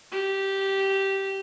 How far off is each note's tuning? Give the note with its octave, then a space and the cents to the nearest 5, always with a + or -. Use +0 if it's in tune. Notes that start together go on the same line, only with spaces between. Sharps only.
G4 -10